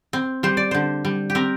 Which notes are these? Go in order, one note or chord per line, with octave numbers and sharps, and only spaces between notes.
C4
G3 C5
D5
D3 C5
G3
G4
C4 A#4